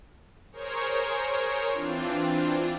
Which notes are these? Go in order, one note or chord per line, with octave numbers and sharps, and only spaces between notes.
G#4 A#4 C5 C#5
E3 C4 D4 F4